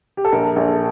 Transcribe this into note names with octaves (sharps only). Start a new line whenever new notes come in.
G4
A4
A#1 A#4
A#1
A4